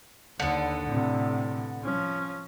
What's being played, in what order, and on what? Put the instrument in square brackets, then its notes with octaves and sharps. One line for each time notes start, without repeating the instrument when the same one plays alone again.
[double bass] D#2 [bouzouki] D3 B3
[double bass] A2 C3
F3 C#4